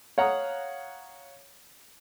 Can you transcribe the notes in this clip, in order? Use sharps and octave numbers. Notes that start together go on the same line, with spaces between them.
C#5 F5 F#5 A#5 D#6